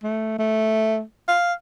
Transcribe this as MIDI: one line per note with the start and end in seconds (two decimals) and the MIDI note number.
0.03 0.37 57
0.39 1.02 57
1.28 1.53 77